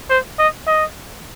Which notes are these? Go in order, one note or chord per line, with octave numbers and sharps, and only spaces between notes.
C5
D#5
D#5